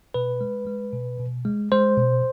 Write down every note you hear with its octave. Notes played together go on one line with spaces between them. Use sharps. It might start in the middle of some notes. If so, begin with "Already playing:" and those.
B2 B4
G#3
G#3
B2
B2
G#3
G#3 C5
B2